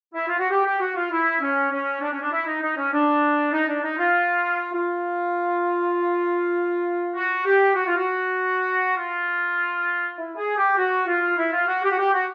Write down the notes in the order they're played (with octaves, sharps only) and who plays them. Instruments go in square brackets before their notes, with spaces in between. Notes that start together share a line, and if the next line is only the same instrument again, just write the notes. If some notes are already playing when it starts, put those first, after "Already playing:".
[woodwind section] E4
F4
F#4
G4
G4
F#4
F4
E4
C#4
C#4
D4
C#4
D4
E4
D#4
D#4
C#4
D4
D#4
D4
D#4
F4
F4
F#4
G4
F#4
F4
F#4
F4
E4
G#4
G4
F#4
F4
E4
F4
F#4
G4
F#4
G4
F#4